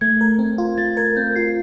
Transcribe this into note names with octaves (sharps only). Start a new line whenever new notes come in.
A3 G#6
A#4
C4
F4
A3 A6
A#4 G#6
C4 G6
F4 C7